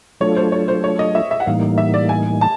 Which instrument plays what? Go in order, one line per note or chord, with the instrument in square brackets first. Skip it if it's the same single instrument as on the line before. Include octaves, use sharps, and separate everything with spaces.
[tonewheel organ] F#3 A3 D4 F4 A4 [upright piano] C#5
[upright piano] C5
C#5
C5
C#5
D#5
E5
E5
F#5
[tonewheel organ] A2 E3 G3 A#3 D#4 [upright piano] F5
[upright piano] E5
D5
G#5
A5